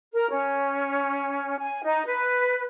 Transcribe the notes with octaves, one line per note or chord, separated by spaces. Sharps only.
A#4
C#4
G#5
D#4
B4